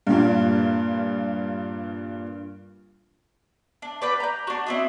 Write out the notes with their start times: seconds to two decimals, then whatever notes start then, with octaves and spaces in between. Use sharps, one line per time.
0.07 G2 A#2
3.82 D4
4.02 B4 D5 G5
4.20 A#5 G6
4.47 D4 F#4
4.67 C4 E4 D#5